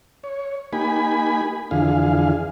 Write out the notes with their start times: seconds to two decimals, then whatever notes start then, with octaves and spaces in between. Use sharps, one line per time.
0.24 C#5
0.73 A#3 D#4 G4 G#5 B5
1.71 F2 D3 E3 G#4 F5